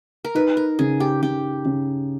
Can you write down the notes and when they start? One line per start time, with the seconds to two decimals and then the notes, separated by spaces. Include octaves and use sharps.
0.25 A#4
0.35 D#4 B4
0.57 A#4
0.79 C#3 G#4
1.00 G4
1.22 C#3 G4
1.65 C#3